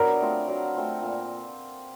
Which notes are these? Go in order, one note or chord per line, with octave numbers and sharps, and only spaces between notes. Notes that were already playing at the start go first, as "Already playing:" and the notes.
Already playing: F#3 B3 D4 A#4
A3 C4 F4
F#3
A3 C4 F4
A#2